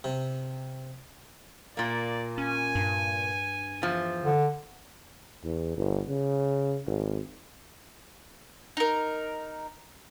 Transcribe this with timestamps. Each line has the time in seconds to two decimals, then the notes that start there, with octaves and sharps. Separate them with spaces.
0.04 C3
1.77 A#2 A#3 D5
2.38 C#4 G#5
2.75 G2
3.82 E2 F3
4.24 D3
5.44 E2
5.77 G1
6.08 C#3
6.87 G#1
8.77 D#4 A#4